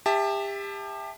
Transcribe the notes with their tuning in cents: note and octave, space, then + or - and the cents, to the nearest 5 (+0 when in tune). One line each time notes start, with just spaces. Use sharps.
G4 +30 E5 -5 A5 +0